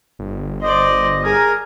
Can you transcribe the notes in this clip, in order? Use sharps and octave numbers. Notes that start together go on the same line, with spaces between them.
G1
C5 D5 D#5
G#4 A#4 G#5